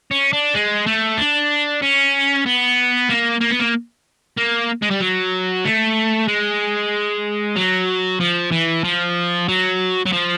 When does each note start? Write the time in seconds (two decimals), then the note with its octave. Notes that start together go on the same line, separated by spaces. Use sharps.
0.11 C#4
0.33 D4
0.54 G#3
0.86 A3
1.17 D4
1.82 C#4
2.46 B3
3.10 A#3
3.41 A#3
3.51 B3
3.60 A#3
4.37 A#3
4.82 G#3
4.91 G3
5.01 F#3
5.65 A3
6.28 G#3
7.56 F#3
8.20 F3
8.52 E3
8.84 F3
9.49 F#3
10.06 F#3
10.12 F3